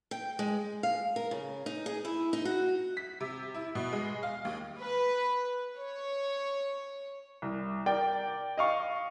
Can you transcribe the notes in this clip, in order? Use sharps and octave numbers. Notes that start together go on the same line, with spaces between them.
G5
G#3
F5
A#4
C#3
D#4
G#4
E4
D#4
F#4
B6
C3
E4
B2
G#3
F5
D#2
B4
C#5
C2
A#4 D5 G5
D#5 F5 C#6